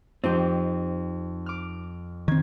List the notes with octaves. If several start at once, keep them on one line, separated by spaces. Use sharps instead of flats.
F2 C4 D#4 G4
D6 F6
D#3 C4 G#6